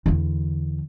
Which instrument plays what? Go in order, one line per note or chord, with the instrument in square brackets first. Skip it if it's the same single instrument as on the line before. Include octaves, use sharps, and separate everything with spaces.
[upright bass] E2 D3